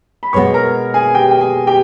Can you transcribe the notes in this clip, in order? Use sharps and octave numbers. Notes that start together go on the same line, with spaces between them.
B5
B2 G#3 B3 C#5 C#6
A#4 A#5
G#4 G#5
G4 G5
G5
G#4 G#5
G4 G5